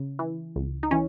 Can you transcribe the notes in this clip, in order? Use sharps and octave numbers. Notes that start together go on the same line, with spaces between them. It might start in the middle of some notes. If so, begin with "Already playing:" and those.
Already playing: C#3
E3
C#2
D#4
E3 C#4